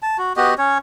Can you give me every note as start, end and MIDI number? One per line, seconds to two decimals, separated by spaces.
0.02 0.17 81
0.18 0.33 66
0.36 0.54 59
0.36 0.54 66
0.36 0.54 67
0.36 0.54 75
0.58 0.78 61
0.58 0.78 73